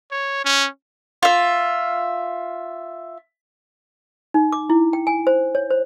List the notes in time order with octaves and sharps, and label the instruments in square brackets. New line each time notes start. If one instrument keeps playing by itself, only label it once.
[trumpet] C#5
C#4
[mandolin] F4 E5
[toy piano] D#4
D6
E4
G5
G#5
C5
C#5
C5